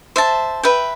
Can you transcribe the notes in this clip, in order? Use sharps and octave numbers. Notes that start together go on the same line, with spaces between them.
C5 E5 A5
B4 E5 G5